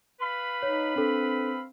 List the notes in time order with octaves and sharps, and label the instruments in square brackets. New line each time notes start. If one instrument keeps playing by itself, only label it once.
[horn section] B4 F5 B5
[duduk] D#4 [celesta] C#5
[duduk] C4 [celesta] D4 A4